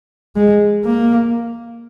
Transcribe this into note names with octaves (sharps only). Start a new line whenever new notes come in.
G#3
A#3